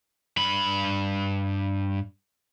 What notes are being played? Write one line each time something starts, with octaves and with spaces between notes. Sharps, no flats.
G2 B5